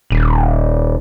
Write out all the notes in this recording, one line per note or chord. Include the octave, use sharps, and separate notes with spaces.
D#1